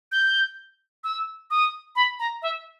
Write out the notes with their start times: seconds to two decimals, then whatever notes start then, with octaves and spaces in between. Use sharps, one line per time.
0.12 G6
1.04 E6
1.51 D#6
1.96 B5
2.19 A#5
2.42 E5